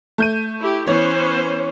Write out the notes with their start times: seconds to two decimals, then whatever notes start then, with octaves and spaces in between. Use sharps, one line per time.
0.18 A3 G6 D#7
0.58 E4 G4
0.87 E3 B3 C#4 C5 C#5